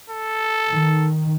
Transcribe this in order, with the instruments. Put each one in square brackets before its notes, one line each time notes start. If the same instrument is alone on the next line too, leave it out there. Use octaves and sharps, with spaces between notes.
[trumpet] A4
[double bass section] D#3